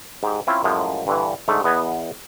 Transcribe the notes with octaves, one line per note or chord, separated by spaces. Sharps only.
G#2 G4
C4 C#4 E4 F4
F#2 A2 F3 G#3
G2 D3 E3
G#2 D3 A3
E2 B3 D#5 G#5